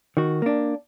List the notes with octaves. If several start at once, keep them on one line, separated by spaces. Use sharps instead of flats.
D#3 F#4
A#3 D4